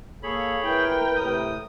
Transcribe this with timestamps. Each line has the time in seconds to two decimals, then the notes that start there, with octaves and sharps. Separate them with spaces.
0.23 A#3 G#4 A4 C#5 B5
0.63 E4 A#4 B4 G5
1.16 A2 C3 D#6